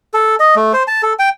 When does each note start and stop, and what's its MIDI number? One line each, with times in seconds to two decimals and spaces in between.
0.14 0.35 69
0.40 0.55 75
0.56 0.72 57
0.73 0.83 72
0.88 1.02 81
1.03 1.13 69
1.19 1.29 79